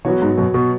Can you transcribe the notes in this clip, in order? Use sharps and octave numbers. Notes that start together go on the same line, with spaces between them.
B2 E3 F#3 B3 F#4 C#5
G#2
F#2 B2
B2